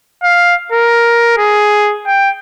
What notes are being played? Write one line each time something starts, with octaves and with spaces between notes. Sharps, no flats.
F5
A#4
G#4
G5